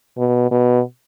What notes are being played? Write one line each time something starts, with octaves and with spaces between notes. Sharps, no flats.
B2
B2